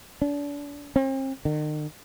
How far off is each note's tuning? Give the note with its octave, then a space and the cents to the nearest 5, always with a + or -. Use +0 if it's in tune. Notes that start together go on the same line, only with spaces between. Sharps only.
D4 -35
C4 +40
D#3 -40